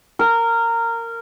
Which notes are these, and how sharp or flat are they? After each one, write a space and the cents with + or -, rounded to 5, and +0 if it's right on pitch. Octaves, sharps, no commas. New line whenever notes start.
A#4 -15